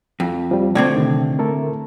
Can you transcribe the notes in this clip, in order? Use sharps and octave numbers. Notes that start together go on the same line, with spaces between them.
F2
F3 G3
A2 D3 C4 D4 G#6
C3 D#3
A3 A4 A#4